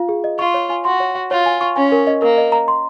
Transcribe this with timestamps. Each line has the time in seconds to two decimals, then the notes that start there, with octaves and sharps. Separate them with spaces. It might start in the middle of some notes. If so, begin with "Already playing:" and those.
Already playing: F4 F5
0.09 G#4
0.24 D#5
0.39 F4 C#6
0.54 C#5
0.70 G#5
0.85 F#4 C6
1.00 C#5
1.15 F#5
1.31 F4 C#5
1.46 G#5
1.61 C#6
1.76 C#4 G#5
1.92 A#4
2.07 D#5
2.22 A#3 A#4
2.38 D#5
2.52 A#5
2.68 C6